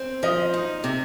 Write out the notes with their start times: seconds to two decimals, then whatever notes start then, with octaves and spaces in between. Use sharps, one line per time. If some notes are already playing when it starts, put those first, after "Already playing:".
Already playing: C4
0.23 F3 D#5
0.54 D#4
0.84 C3